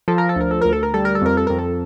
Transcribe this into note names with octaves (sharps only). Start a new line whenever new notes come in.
F3 A4
A#4
A4
D2 A#4
A4
D2 A#4
A4
A#4
G3 A4
A#4
A4
F2 A#4
A4
F2 A#4
A4